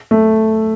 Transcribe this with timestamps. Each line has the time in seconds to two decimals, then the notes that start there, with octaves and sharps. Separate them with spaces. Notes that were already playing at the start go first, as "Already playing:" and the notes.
0.11 A3